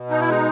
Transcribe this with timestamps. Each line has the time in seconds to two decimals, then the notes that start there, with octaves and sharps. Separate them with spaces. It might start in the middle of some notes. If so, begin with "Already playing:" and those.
Already playing: B2
0.10 D#4
0.20 E4
0.27 G#3 D#4